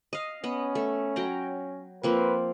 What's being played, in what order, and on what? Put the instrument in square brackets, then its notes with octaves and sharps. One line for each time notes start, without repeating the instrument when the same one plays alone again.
[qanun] D#5 F5
[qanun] B3 D#5 [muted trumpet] C#4
[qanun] A3
F#3 G5 A#5
[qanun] F3 A#3 C4 [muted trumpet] B4